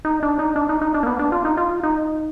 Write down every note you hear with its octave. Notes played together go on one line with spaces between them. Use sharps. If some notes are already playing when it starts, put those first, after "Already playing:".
D#4
D4
D#4
D4
D#4
D#4
D4
A#3
B3
D4
F4
D#4
F4
D#4